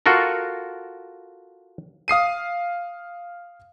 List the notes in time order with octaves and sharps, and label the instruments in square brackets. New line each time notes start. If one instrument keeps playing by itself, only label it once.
[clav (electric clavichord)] F4 F#4 A4 A#4
[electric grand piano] F5 D#6 C7 D#7